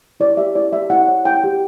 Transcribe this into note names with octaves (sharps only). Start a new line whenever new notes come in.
E4 D5
G4 E5
E4 D5
G4 E5
E4 F#5
C#5
E4 G5
G4